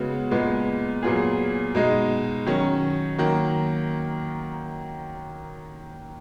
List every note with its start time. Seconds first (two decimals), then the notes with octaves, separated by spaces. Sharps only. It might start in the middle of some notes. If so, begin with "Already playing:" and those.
Already playing: C#3 G#3 B3 F#4
0.31 A#2 G#3 B3
1.03 A#2 F#3 B3 F4 G#4
1.75 B2 G#3 D#4
2.46 D#3 F#3 C#4
3.18 D#3 F#3 A#3